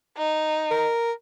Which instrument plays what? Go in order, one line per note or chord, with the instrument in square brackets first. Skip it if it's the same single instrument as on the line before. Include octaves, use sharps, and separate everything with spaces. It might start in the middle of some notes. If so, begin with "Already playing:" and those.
[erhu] D#4
[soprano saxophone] A#4